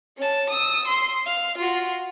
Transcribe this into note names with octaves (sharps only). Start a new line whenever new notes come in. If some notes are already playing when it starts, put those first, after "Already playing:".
C#4 A5
D#6 E6
C6
F5
F4 F#4